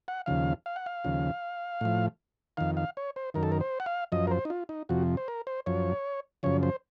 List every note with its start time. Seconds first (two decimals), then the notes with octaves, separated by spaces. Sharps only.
0.08 F#5
0.26 D#2 C#3 F3 F5
0.66 F5
0.76 F#5
0.86 F5
1.04 D#2 C#3 F3
1.81 A2 F3
2.57 F2 D#3 F5
2.77 F5
2.97 C#5
3.16 C5
3.34 F#2 D#3 A#4
3.43 A4
3.52 A#4
3.61 C5
3.80 F#5
3.86 F5
4.12 F#2 F3 D#5
4.27 A#4
4.31 C5
4.45 D#4
4.50 F4
4.69 D#4
4.89 F2 C3 F3 F#4
5.17 C5
5.28 A#4
5.47 C5
5.66 F#2 F3 C#5
6.43 F#2 C#3 F3 C#5
6.63 C5